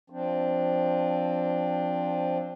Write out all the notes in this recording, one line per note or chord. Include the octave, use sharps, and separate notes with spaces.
F3 C4 D4